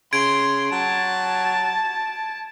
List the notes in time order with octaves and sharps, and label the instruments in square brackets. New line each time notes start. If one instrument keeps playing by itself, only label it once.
[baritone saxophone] C#3 [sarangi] C6 [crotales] G#6 D7
[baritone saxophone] F#3 [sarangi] A5